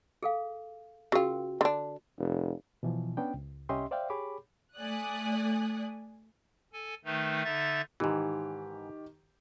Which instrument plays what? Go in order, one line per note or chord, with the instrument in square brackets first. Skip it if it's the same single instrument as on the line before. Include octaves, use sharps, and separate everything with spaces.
[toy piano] G#4 A4 F5
[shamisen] C#3 F4 [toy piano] F#4 A#4 G5
[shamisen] D3 D4
[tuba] F1
[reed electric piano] B2 E3 F3
B3 C#4 D4 G5
C#2
C2 C#4 G4 D#5 E5 C6
C5 D5 E5 F5 G5
G4 G#4 C#5 B5 D6
[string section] A3 D5 G#5 D#6 F#6
[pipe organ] A4 G#5
D#3 A3 D#4 B4
D3 D#4 E5 A6
[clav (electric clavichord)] G#2 E3 [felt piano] D#3 G4